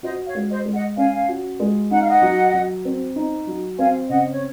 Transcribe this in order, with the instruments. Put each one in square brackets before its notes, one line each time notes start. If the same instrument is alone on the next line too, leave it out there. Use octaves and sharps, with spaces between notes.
[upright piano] F#4 [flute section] C5 D#5
[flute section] C#5 F5
[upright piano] G#3
[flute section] C5 D#5
[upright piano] G#3
[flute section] D#5 F#5
[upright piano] C#4 [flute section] F5 G#5
[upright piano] F#4
G#3
[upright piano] D#4 [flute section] F#5
[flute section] F5
D#5 F#5
[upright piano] F#3
F#3
C4
D#4
F#3
[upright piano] C4 [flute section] F5 G#5
[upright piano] C#3 [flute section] D#5 F#5
[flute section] C#5